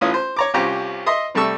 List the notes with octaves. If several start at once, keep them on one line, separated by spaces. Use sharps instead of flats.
A1 E3 F4 C#5 D#6
C5
C#5 A#5 D6
C2 C#4 F4 G4 C5 A#5
D#5 E5 C6 D#6
C3 G3 A3 A5 C#6 E6